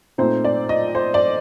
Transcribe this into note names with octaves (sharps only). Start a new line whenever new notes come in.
A#2 A3 C4 D#4 C5
D5
D#5
C5
D5